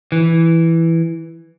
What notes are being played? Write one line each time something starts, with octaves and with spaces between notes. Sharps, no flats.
E3